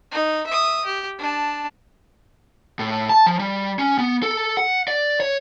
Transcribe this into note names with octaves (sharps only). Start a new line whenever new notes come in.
D#4
E5 D#6
G4
D4 A5
A2
A5
F3
G3
C#4
B3
A4
F#5
D5
C#5